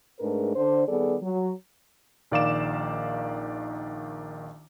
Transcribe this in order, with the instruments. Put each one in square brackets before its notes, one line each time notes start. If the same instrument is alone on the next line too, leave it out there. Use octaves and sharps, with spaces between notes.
[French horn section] G#2 A3 D4 G#4 A#4 B4
D3 D4 C5
D#3 G3 B3 G#4 A4 D5
F#3
[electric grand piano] A#1 D#3 D5 F5 D6 E7